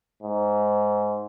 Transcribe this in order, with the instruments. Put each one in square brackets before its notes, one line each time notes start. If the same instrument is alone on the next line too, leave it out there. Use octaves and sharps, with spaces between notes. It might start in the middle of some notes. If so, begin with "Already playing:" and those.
[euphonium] G#2